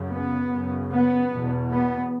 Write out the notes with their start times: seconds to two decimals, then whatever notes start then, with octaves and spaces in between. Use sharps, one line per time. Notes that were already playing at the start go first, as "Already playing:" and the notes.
Already playing: F#2 C#3
0.12 B3
0.52 F#2 C#3
0.92 B3
1.32 E2 B2
1.72 B3